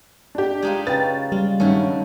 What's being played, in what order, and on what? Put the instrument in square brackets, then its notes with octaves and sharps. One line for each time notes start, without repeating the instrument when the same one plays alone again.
[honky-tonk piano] D4 G4
[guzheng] G#3 D#4 F4
[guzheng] C#3 [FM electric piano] B4 G5 [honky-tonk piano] A6
[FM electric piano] G3 [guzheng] F4
[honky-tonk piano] G2 D#3 [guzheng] F#3 A3 C#4